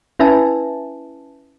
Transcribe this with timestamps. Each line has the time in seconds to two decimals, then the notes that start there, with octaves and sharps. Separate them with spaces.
0.19 C#4 E4 B4 E5 G#5 A5